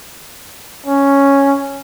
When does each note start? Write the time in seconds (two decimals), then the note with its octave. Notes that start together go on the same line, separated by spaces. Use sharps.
0.86 C#4